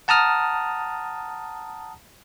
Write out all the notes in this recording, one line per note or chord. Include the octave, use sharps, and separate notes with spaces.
F#5 A5 A#5 D#6 F6